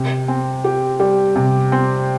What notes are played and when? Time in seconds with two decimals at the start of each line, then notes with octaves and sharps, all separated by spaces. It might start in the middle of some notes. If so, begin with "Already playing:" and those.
Already playing: C3
0.28 C4
0.64 G4
1.00 G3
1.36 C3
1.72 C4